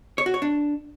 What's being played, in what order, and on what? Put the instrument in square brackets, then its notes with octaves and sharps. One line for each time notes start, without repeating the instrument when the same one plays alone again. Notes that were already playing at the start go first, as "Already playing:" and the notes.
[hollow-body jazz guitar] C#5
F#4
C#5
D4